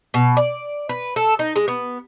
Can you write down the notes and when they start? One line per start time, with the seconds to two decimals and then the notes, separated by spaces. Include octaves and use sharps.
0.14 B2
0.37 D5
0.89 B4
1.16 A4
1.39 D#4
1.56 G#3
1.68 B3